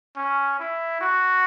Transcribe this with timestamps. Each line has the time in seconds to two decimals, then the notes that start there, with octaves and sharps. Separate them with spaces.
0.17 C#4
0.59 E4
1.01 F#4